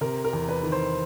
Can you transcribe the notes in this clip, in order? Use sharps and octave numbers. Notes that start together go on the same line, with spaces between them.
C3 A#4
A#4
E2
B4
D#3
C5